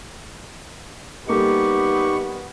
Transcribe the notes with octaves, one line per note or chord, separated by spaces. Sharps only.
G3 A#3 B3 D#4 G4 A4 C#6